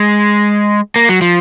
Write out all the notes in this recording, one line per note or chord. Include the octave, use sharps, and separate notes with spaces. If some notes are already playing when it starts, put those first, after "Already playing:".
Already playing: G#3
A#3
F#3
F3